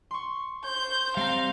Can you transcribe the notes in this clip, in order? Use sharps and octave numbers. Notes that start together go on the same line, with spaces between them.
C6 C#6
C5 G6
G3 C4 F5 A#5